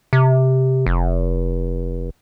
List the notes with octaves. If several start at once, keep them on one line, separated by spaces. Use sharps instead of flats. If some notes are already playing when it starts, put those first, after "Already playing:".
C3
F1